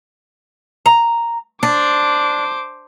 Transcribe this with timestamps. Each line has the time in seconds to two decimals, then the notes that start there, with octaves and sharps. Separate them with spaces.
0.86 A#5
1.63 D4 C5 D6